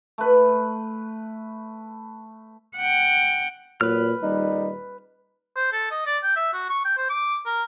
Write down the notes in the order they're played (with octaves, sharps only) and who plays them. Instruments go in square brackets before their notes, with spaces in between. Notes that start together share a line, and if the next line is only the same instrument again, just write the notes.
[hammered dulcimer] A3 B4
[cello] F#5 G5
[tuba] A#2 [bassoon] F#3 [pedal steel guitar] B4 F6
[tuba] D#1 [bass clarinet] G3 [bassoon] D#4
[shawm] C5
A4
D#5
D5
G5
E5
F#4
C#6
G5
C5
D6
A#4